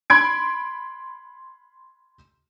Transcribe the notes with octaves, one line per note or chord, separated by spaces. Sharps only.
B5 C6 G#6 D7